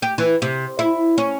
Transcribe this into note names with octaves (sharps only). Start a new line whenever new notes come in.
G4
E3
C3
E4
C#4